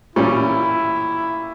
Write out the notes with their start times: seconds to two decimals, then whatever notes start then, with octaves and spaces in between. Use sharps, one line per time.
0.16 A#2 G3 C#4 E4